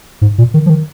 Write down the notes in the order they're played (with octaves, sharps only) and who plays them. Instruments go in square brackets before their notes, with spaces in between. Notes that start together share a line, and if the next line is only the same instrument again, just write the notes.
[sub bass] G#2
A#2
D#3
F3
D#3